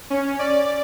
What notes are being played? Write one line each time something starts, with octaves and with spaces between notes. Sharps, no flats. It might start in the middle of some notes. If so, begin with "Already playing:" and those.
C#4
D5